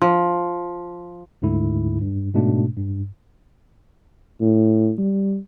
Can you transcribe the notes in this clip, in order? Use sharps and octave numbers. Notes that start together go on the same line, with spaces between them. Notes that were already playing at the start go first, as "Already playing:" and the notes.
F3
D2 G#2 D3 E4
G2
G#2 B2 A3 D4
G2
A2
G3